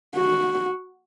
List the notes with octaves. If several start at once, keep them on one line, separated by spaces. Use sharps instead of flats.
F#4